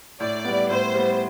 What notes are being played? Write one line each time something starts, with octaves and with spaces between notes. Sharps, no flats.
A2 D5
G3 B3
A2 C5
G3 B3